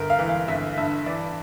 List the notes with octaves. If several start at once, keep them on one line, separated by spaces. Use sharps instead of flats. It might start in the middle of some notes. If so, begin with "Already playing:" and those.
Already playing: G1 A#4
F5
E3
F5
G1 E5
G2 E5
E3 D5